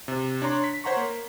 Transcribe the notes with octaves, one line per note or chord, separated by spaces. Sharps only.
C3
D4 C#5 A#5 C6
B6
C5 C#5 F#5 A#5 C6 C#6
A#3